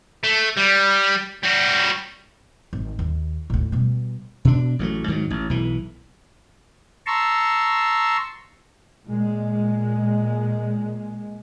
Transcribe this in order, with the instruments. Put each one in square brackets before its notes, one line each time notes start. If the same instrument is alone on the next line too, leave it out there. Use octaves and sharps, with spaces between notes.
[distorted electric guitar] A3
G3
G3 F#4
[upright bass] G#1
D#2
D2 A2
B2 G3
[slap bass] B2 D4
A1 F#3 G3 A3
G#2 D#3 F3 F#3
A1
B1 E3
[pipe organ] A5 A#5 C6 C#6 E6
[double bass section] A#2 G#3